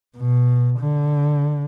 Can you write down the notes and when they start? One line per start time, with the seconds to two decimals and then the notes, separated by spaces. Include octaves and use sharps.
0.17 B2
0.80 D3